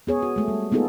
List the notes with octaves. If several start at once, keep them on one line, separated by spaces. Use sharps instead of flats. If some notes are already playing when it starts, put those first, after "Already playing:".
B3 G#4 C#5
F#4
G#3 A3
G3
A#3 B3 D#4 F4 G#4 A4